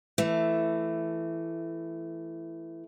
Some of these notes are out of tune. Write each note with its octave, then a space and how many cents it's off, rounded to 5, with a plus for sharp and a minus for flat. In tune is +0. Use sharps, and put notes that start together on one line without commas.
E3 +10 A3 +0